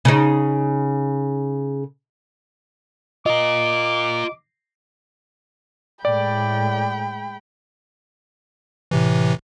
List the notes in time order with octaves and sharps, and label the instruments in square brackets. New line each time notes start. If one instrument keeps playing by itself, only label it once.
[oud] C#3 D#4
[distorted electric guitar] F4 A#4 [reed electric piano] D#5 [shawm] D6
[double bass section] A2 [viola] G#3 B5 [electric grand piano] D5 [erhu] G5
[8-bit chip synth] A2 C3 E3